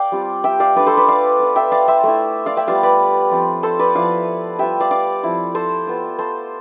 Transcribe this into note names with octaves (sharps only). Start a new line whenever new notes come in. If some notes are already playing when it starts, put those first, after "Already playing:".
Already playing: D5 F5 G5
G3 C4 F4
E5 G5
D5 F5
A3 D4 F4 B4 D5
A4 C5
B4 D5
D5 F5
B3 F4
E5 G5
D5 F5
C5 E5
A3 E4
D5 F5
E5 G5
G3 B3 F4 D5 F5
B4 D5
F3 C4 F4
A4 C5
B4 D5
F3 B3 E4 D5 F5
G3 B3 F4 E5 G5
D5 F5
D5 F5
F3 C4 E4
A4 C5
B3 F4
A4 C5